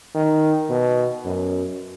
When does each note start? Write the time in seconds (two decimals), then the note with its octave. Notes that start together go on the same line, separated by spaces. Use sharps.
0.15 D#3
0.70 B2
1.25 F#2